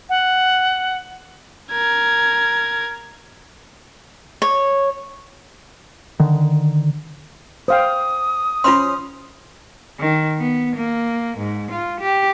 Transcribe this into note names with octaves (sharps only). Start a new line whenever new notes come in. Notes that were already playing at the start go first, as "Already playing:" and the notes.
F#5
A#4 G#6
C#5
D3 D#3
C5 F5 G5 D#6
C#4 F4 C5 B5 C6
D#3
B3
A#3
G#2
F4
G4